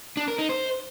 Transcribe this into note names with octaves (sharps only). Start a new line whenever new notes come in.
D4
A#4
D#4
C5